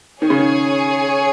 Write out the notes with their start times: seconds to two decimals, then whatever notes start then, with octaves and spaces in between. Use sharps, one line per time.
0.22 D#3 G#4 C#5 G#5
0.30 C#3
0.39 D#3